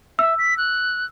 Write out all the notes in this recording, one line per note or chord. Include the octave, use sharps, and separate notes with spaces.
E5 E6
B6
F#6